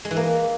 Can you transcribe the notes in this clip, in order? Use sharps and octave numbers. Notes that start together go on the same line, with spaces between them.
G#3
E3
A#3